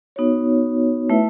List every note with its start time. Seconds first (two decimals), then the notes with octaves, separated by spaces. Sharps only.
0.16 B3 D#4 F#4 C#5
1.10 A3 E4 B4 E5